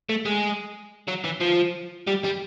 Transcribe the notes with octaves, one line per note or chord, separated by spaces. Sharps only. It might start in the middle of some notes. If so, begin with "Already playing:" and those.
A3
G#3
F#3
E3
F3
G3
G3